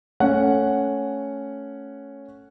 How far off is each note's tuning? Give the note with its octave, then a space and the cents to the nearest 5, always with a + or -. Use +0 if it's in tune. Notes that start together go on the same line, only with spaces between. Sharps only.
A3 +0 C#4 +0 F#5 +0